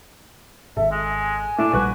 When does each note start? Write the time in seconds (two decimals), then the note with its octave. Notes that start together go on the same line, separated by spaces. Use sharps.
0.77 G#1 A4 E5
0.92 G#3 G#5
1.58 A#2 A3 D4 E4
1.73 A#1 G3 F#4 B4